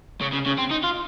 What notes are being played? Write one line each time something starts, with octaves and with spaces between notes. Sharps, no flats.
C#3
C#3
C#3
C4
D#4
F4